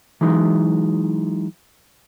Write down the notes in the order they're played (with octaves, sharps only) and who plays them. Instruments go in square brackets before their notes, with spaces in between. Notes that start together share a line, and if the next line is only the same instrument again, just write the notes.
[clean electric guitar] E3 F#3 G#3 D#4